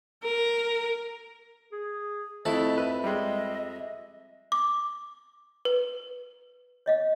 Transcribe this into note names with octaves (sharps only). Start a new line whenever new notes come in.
A#4
G#4
F2 A3 E4 D#5 E5 A5 B5
B4
G3 G#3 D#5 E5
D6
B4
C#5 D#5 F5